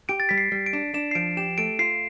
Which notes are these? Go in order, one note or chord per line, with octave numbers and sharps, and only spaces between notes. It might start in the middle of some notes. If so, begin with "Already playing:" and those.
G4 D7
A6
G3 B6
C7
G3
D7
D4
D4 E7
C7
F3 D7
G4 E7
A3 D7
F4 C7